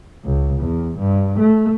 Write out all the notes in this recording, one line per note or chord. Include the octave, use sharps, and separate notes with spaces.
C#2
E2
G2
A3